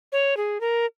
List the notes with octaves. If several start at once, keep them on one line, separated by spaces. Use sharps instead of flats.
C#5
G#4
A#4